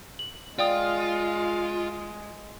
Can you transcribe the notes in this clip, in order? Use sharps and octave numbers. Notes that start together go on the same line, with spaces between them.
F#7
G#3 F4 D5 G5 D#6